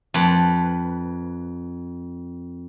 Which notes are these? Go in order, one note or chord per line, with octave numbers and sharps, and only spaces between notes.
F2 B4